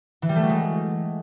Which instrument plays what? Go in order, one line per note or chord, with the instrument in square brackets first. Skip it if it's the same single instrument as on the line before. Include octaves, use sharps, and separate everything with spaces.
[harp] E3
G3
A3
F#3
G#3